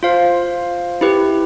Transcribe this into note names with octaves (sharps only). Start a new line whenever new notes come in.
F4 C5 F5
E4 G4 B4